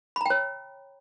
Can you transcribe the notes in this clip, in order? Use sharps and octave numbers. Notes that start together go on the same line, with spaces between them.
C#5 G5 A#5 B5